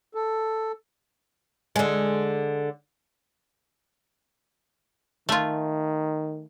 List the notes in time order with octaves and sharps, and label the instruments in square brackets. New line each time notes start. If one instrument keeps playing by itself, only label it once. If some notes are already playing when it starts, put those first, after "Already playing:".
[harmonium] A4
[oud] D3 G#3
[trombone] D#3 [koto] A3 F4